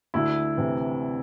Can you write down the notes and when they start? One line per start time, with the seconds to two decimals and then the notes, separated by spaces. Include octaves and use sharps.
0.14 D2 E4
0.57 C3 E3